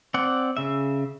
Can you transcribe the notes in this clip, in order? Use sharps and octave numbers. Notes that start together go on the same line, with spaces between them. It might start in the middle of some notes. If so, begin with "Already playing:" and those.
C4 D5 F#5
C#3 E5